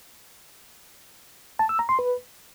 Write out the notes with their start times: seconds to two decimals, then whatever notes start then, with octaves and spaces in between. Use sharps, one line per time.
1.59 A5
1.69 E6
1.79 A#5
1.89 C6
1.99 B4